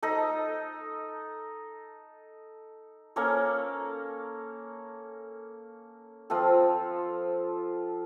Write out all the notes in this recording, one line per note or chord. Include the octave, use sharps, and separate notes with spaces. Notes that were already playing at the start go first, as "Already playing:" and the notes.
D#4 A4 D#5
A#3 C#4 A4 C#5
F3 C4 F4 A4